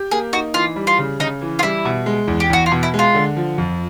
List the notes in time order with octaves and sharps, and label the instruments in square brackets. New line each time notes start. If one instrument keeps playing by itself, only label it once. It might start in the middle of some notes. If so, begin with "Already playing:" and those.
Already playing: [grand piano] G4
[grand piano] A#3 [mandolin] G#4
[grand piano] D#4 [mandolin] F#4
[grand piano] E3 [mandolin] F4
[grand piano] G3
[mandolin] F4
[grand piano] C#3
[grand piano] C#3 [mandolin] D#4
[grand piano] E3
[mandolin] F4
[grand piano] G3 [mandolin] E4
[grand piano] B2
G#3
E2
[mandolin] G4
[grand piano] E2 [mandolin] F#4
[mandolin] F4
[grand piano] B2
[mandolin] E4
[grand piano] G#3
[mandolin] F4
[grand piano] D3
F3
F2